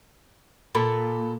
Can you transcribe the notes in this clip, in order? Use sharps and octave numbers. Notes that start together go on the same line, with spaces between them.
A#2 A4 B5